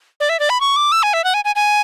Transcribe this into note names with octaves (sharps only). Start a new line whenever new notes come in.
D5
E5
D5
B5
C#6
D6
E6
G#5
E5
F#5
G#5
G#5
G#5